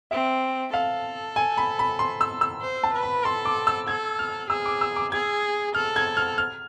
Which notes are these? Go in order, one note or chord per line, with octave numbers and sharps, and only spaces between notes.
C4 E5
A4 F5
G#5
B5
B5
C6
E6
E6
C5
A5
B4
B5
A4 C6
D6
E6
A4 G#6
F6
G#4 E6
D6
E6
D6
G#4 G#6
A4 F6
G#6
F6
F6